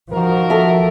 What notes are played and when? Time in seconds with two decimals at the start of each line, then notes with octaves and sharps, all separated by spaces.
0.12 D#3 F3 F#4 A#4
0.50 A4 E5